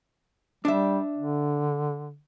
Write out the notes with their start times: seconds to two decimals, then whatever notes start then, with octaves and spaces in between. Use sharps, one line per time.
0.65 G3 D4 E5
1.17 D3